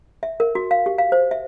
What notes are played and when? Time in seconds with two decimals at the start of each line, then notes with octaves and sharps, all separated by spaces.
0.23 E5
0.40 A#4
0.55 F#4
0.71 F5
0.86 G4
0.98 F5
1.12 C5
1.31 E5